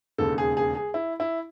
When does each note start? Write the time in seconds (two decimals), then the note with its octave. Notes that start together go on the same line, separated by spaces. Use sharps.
0.18 E1 D#2 C#3 A4
0.38 G#4
0.57 G#4
0.75 G#4
0.94 E4
1.20 E4